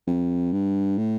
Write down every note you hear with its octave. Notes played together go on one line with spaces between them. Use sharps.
F2
G2
A2